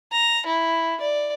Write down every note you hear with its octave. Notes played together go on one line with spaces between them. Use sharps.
A#5
E4
D5